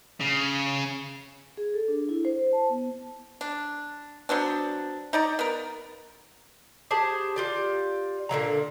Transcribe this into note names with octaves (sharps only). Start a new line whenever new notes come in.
C#3
G#4
A4
D4
E4
C5
A5
B3
D4
F#3 B3 C4 D4
D#4 D5 A#5
B3 A#4
G4 G#4 C5 A5
F4 G4 D5
A#2 D3 F#3 A#5